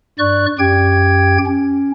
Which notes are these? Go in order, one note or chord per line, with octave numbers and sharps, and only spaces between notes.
G2 D5 C#6 F#6
F#2 G4 G5 G#6
C#4